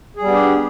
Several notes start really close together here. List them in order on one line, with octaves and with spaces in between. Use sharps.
G#4 G3 B3 D4 G4